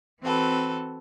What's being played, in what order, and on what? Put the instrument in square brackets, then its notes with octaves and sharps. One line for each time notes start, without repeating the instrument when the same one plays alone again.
[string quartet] E3 C4 F#4 A4 B4